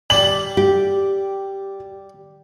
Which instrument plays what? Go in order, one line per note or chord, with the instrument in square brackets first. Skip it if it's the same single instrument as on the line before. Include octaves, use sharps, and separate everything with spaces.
[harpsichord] G3 D5 [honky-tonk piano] F#7
[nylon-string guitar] G4